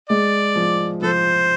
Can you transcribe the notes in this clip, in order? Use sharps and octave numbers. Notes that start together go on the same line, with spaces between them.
G#3 D5
F3
F3 A4 C5